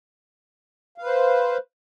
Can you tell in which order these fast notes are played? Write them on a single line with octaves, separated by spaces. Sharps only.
F5 B4 C5